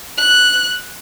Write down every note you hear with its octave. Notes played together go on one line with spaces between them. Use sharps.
F#6